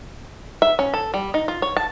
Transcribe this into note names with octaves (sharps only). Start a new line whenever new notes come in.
E5
C#4
A4
G3
D#4
F4
C#5
A5